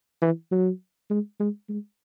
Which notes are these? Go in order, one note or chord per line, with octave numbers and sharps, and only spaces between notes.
E3
F#3
G#3
G#3
G#3